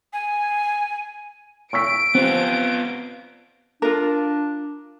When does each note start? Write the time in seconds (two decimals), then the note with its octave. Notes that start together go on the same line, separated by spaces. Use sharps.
0.13 G#5
1.73 C#6 E6 B6 D7
2.15 B3 C4 F4
3.82 D4 F4 A#4